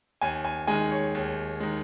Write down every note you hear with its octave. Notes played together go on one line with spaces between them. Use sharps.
D#2 G#5
G#5
D#3 G#3 G#5
C#5
D#2
D#3 G#3